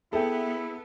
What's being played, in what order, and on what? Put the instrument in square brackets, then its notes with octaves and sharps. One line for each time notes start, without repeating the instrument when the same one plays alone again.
[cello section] B3 [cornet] E4 [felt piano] G#4 E5 G5 [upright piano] A4